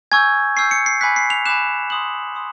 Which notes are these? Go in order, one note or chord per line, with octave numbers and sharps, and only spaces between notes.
G#5 C#6 E6 G6 G#6
G#5 C#6 E6 G6 C7
C#7
C7
G#5 B5 D6 F#6 B6
C7
F7
G#5 B5 D6 F#6 E7
C6 D#6 F#6 F#7
C6 D#6